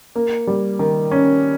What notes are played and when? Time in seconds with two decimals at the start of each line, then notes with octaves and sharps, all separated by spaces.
0.16 A#3
0.47 G3
0.79 D#3
1.11 C#4